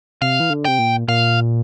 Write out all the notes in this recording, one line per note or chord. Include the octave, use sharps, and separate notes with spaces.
C3 F5
E3
D3
C3 G5
A#2
A#2 F5